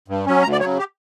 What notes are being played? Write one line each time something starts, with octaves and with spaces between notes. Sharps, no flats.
G2
F#3 C#4
D2 A#5
D5
C#3 F#3 C#5
G4